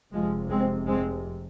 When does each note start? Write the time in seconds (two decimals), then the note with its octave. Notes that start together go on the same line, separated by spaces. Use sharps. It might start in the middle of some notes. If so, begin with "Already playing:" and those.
0.12 F1 F2 C3 F3 G#3
0.49 G#3 C4
0.86 G#3 C4